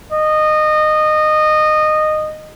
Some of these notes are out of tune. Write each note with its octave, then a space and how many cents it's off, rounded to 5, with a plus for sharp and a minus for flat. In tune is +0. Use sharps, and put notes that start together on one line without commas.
D#5 -20